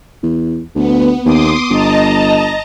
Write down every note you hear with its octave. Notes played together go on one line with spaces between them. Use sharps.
E2
D2 B3
D#2 C6 D6 D#6
G1 D#5 A5 A#5